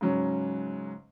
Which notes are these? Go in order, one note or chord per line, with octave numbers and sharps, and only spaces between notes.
G#2 C#3 F#3 C#4